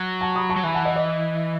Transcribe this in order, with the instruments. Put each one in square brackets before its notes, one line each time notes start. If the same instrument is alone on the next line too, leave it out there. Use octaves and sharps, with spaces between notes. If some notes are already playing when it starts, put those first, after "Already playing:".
Already playing: [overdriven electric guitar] F#3
[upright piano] F#5 A5
B5 D#6
A5 C#6
[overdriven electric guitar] F#3
[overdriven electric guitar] E3 [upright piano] G#5 B5
[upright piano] F#5 A5
D#5 F#5
D#5